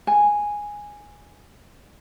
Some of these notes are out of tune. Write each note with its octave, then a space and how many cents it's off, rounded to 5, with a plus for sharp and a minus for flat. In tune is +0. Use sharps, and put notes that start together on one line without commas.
G#5 -5